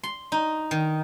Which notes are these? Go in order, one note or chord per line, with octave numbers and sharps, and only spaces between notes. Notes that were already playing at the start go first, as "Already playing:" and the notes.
C6
D#4
D#3